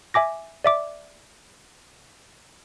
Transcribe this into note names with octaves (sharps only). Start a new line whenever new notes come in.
E5 G#5 D6 A#6
D5 E5 D6